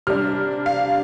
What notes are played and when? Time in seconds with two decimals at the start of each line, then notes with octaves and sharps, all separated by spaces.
0.07 C3 G3 D4 F6
0.66 F5